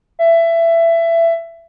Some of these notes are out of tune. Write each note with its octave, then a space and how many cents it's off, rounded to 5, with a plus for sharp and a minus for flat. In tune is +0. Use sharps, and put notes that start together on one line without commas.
E5 +20